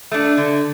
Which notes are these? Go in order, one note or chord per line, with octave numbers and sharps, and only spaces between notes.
A3 D4
D3